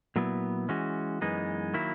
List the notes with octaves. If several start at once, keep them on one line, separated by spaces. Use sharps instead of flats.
A#2 F#3 B3 E4
E3 G#3 C#4 F#4
F#2 E3 G#3 B3 D#4
D#3 F#3 A#3 E4